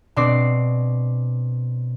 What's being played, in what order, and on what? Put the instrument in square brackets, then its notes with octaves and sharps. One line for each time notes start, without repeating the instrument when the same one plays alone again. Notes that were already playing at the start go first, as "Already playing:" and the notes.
[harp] B2 C4 D4 D5 C7